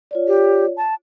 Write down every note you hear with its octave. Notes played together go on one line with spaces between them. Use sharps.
F4 C#5 D5
G4
A5